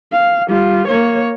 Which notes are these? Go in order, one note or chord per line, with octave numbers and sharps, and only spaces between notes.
F5
G3 F4
A#3 C#5